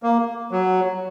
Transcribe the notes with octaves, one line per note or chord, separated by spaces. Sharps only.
A#3
F#3